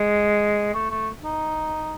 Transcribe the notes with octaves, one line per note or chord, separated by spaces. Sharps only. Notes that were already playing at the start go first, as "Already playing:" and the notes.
Already playing: G#3
A3
A3
D#4